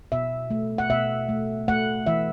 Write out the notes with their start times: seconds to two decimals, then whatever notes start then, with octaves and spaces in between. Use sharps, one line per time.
0.12 B2 E5
0.50 A3
0.78 F#5
0.90 B2 E5
1.29 A3
1.68 A3 F#5
2.06 E3 E5